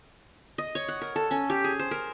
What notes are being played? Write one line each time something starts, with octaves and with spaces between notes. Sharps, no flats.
D#5
C#5
F#5
A#4
A4
C#4
G4
G#4
C5
A#4